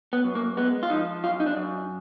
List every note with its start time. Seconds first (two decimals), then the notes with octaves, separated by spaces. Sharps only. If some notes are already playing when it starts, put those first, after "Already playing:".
0.13 B3
0.24 F#2
0.35 A#3
0.57 G#3 B3
0.83 F4
0.90 F3 D#4
1.24 F#2 F4
1.40 D#4
1.46 D4
1.57 F#2